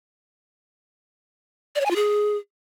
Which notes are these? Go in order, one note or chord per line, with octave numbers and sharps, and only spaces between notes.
D5
C#5
G#5
F4
G#4